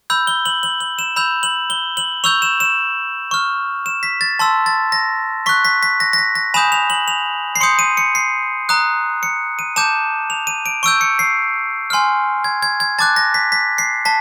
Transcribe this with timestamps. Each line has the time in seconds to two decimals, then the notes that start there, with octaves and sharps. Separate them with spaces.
0.10 B5 E6 G6
0.27 G7
0.45 F#7
0.63 F#7
0.80 F#7
0.99 E7
1.16 B5 E6 G6 F7
1.43 F#7
1.70 G7
1.97 F#7
2.24 C#6 E6 G6 F7
2.42 E7
2.60 E7
3.31 C#6 F6
3.86 E7
4.03 B6
4.21 A6
4.39 A5 C6 E6
4.66 A6
4.92 A#6
5.46 C#6 F#6 B6
5.65 B6
5.83 B6
6.00 A#6
6.13 A#6
6.18 B6
6.35 A#6
6.54 G#5 B5 D#6 G6 E7
6.72 F7
6.90 F#7
7.08 F7
7.56 C7
7.61 C6 D#6 G6 C#7
7.79 D#7
7.97 C#7
8.15 C7
8.69 A#5 D#6 F#6
9.23 C#7
9.59 D#7
9.76 A5 D6 G6 E7
10.30 F7
10.47 D#7
10.66 D7
10.83 C#6 E6 G6 D7
11.01 C#7
11.19 C7
11.90 G#5 C6 F6
12.44 G#6
12.63 G#6
12.80 G#6
12.99 A5 D6 F#6 A6
13.16 A#6
13.34 B6
13.52 B6
13.78 C7
14.05 A5 B6